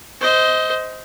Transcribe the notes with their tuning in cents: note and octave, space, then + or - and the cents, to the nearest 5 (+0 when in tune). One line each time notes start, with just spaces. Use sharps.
C5 -15 D#5 +20